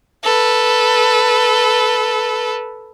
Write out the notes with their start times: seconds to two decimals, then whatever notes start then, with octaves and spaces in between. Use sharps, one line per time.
0.24 A4 B4